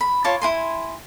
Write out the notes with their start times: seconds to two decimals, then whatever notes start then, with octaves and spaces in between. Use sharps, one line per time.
0.01 B5
0.24 F4 C#5 A5 D6
0.42 E4 G#5 C6